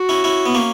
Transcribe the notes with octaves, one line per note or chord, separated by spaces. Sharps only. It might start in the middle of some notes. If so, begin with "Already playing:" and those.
Already playing: F#4
C#4 E4
C#4 E4
B3
A#3 C#4